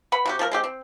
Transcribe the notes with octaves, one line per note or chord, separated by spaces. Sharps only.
B4 F#5 B5
C3 F#4 G4
F3 A3 G#4 A#4
G#3 C4 G4
C4